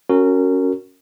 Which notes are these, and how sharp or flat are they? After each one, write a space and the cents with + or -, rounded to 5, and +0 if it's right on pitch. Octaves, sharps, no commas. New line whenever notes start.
C#4 +0 F#4 +0 A#4 -25